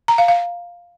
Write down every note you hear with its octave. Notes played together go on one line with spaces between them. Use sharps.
A#5
F5
F5